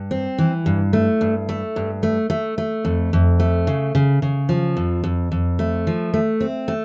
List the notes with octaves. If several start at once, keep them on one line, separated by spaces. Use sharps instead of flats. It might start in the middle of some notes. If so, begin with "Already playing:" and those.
Already playing: G2
C4
E3
G2
A3
G2
A3
G2
A3
A3
A3
F2
F2
A3
C#3
C#3
C#3
F3
F2
F2
F2
A3
F3
A3
C4
A3